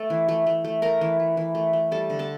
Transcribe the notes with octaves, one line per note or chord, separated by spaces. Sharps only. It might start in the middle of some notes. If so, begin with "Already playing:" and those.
Already playing: A3 A4 A5
E3
A3
A3
A3
A3 A#4 A#5
E3
A3
E3
A3
A3
G3 A4 A5
D3
A4 A5